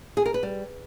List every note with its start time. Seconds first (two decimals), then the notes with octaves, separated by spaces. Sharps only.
0.17 G#4
0.26 A#4
0.34 B4
0.43 G3